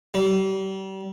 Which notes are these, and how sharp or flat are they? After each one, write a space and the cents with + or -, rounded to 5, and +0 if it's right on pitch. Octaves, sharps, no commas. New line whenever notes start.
G3 -35